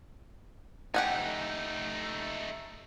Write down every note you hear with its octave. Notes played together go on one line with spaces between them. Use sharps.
A3 D#4 G4 F#5 G#5